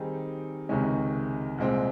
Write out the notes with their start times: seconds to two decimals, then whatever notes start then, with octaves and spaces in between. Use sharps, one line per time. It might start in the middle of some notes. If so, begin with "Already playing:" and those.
Already playing: D#3 G3 C4 D#4 G#4
0.69 C#2 C3 D#3 G#3 C#4
1.58 C2 A#2 G#3 C4